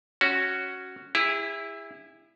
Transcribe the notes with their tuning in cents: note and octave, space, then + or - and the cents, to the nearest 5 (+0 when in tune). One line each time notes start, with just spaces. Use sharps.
C#4 +0 F#4 +0 C#5 +0
E4 +0 G#4 -40